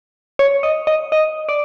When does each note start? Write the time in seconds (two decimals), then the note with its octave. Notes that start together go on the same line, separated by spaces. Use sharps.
0.39 C#5
0.63 D#5
0.87 D#5
1.12 D#5
1.49 D5